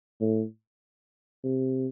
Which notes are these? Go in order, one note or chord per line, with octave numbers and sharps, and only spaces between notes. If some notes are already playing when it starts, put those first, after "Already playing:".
A2
C3